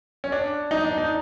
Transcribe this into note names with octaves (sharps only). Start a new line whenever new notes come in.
C#4
D4
D#4
D4
D#4